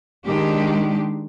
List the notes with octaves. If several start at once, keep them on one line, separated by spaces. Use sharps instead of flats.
D#3 G#3 D4 G4